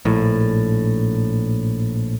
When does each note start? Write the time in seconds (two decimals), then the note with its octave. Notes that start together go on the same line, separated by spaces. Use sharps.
0.05 A#1 A2